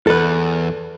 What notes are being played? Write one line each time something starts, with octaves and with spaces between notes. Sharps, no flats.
E2 A4 B4